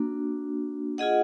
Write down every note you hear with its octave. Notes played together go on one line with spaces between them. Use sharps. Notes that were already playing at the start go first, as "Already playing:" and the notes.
Already playing: A#3 D4 F#4
F4 G#4 D#5 F#5